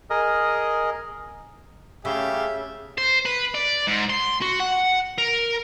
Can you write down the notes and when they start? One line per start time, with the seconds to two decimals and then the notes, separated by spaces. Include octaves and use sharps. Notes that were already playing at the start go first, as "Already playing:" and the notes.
0.10 G#4 A#4 D#5
2.05 C#3 A3 G4 G#4 E5 F5
2.98 C5
3.25 B4
3.54 D5
3.87 G#2
4.10 C6
4.42 F#4
4.60 F#5
5.18 A#4